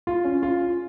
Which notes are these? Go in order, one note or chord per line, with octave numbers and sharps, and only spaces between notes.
F4
C#4
F4